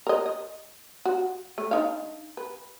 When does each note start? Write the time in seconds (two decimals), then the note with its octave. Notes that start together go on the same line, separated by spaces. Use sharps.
0.07 A#4 D#5
0.26 D#5
1.05 F#4
1.58 A3
1.71 D4 D#4 F5
2.37 B4